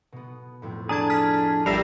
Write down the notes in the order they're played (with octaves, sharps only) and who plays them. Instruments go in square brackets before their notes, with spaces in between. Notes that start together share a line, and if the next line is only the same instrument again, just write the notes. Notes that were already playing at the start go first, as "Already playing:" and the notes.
[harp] B2 B3
F2 A2
[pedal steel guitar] D4 G#4 [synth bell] A#5 G#6
[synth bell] F6 G#6 B6
[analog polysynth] A#1 G3 [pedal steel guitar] A#4 E5 [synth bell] A#6 C7